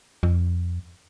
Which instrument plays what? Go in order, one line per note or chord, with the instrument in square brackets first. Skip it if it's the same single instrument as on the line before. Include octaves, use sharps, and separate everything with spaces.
[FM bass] F2